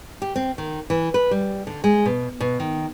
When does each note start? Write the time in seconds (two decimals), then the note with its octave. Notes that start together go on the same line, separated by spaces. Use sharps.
0.22 G4
0.36 C4
0.58 D#3
0.90 E3
1.14 B4
1.31 G3
1.67 D3
1.84 G#3
2.06 B2
2.40 B2
2.60 D#3